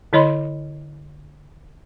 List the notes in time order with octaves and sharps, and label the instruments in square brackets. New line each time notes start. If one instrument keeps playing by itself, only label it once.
[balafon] D3 E4 C#5 D#5 B5 C6